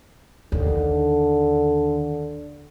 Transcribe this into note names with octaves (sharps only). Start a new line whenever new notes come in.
D#2 D3